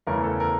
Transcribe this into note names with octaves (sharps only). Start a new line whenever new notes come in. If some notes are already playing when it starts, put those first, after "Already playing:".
E2 C#3 E3 A3 A#4
A4
A#4